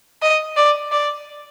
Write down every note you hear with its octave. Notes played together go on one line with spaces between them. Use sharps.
D#5
D5
D5